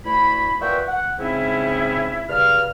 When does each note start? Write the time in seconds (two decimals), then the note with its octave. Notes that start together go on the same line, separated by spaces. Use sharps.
0.05 D2 A3 E4 B5
0.61 A#2 B4 E5 F#5 G5 C#6
0.88 F#5
1.19 G#2 C#3 C4 C#4 E4
2.29 G2 C#3 F5 F6